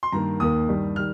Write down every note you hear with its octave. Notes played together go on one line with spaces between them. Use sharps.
C6
G2 D#3 A#3 A#5
D#2 D#3 A#3 D#6
G2 D#3 G3
D#3 G3 F6